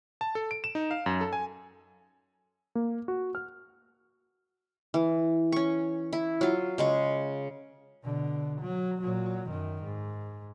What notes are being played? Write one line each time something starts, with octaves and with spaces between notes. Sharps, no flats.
A5
A4
D7
E7
D#4
F5
F#2
A4
G#5
A#3
F#4
F6
E3
C#4 C#6
E4
F#3 F4
C#3 G#3 C#6
B2 D3
F#3
A#2 F#3
F#2 D#3
G#2